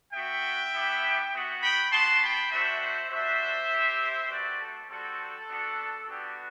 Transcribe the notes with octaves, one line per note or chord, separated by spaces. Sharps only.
B3 F#4 E5 G5
B3 E4 G4
B3 F#4
G5 B5
B3 F#4 A5 C6
G5 B5
A3 D4 F#4 C5 E5
C5 E5
G3 D4 F#4 C5 E5
C4 E4 G4
A3 C4 F#4 B4 D5
A4
G3 C4 F#4 A4
B3 D4 F#4
B3 D4 F#4 G4